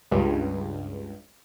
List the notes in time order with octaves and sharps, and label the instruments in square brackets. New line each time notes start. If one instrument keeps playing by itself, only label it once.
[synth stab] C#2 G2